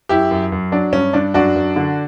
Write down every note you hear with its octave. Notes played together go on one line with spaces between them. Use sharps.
F#2 E4 G4
F#2
F#2
F#3 D4
G2 C#4
G2 D4
F#2 D4 F#4
F#2
D3